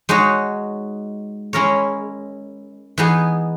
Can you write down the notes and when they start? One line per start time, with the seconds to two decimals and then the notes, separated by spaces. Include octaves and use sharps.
0.09 G#3 D#4 F#4 C#5
1.53 G#3 C#4 E4 A#4 C#5
2.98 E3 B3 D#4 G#4